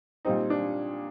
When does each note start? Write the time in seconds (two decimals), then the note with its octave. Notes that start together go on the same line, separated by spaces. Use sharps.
0.25 A#2 G3 C4 D#4
0.50 D4